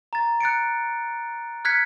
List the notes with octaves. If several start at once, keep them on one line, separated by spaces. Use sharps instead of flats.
A#5 A6
F#6 A6 C#7 D7
F6 F#6 G#6 B6 C#7